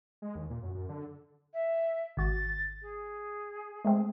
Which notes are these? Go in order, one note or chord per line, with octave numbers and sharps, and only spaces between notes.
G#3
D#2
A#2
F#2
F#2
D3
E5
G#1 F#4 A6
G#4
G#3 A3 C4